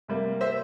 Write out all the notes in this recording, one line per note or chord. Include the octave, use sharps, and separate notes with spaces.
C3 G3 A#3
C5 E5